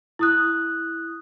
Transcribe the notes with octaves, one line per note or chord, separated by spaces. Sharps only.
E4 D#6 F#6